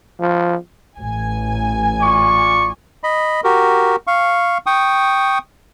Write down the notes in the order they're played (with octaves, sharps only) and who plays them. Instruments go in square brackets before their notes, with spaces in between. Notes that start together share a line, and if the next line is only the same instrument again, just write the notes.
[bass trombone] F3
[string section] A1 G#5
[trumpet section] F4 D5 C#6
[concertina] D#5 B5
F#4 G4 A#4
F5 C#6
G5 C#6 D#6